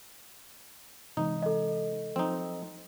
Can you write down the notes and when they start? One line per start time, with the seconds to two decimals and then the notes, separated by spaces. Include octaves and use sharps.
1.17 C3 E3 G#3 D#4
1.42 A4 D#5
2.16 F3 F#3 C4 D#4